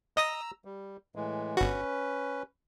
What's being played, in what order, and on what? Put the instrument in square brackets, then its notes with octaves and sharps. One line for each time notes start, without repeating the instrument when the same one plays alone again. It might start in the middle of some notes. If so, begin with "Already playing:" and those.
[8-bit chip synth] D#5 D#6 A#6 [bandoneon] A#5 E6
[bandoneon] G3
A2 E3 G#3
[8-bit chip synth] G1 F#4 [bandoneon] C#4 B4